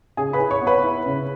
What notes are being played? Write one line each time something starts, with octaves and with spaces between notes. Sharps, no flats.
C#3 G#4 G#5
B4 B5
E4
C#5 C#6
B3
B4 B5
E4
C#3